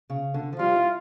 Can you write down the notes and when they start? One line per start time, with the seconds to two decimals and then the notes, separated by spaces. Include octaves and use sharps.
0.10 C#3
0.34 D3
0.53 F3
0.59 G3 F4
0.76 E4